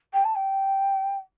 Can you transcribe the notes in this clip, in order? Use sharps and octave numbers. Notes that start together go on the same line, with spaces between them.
G5
A5
G5